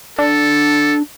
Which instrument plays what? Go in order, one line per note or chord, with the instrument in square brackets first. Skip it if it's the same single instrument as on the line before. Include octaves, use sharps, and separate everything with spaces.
[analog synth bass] D4 [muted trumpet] A4